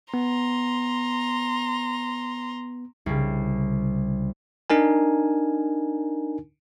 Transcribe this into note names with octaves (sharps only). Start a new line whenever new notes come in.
B3 A#5 C6
C2 C#3
D4 D#4 A#4 G#5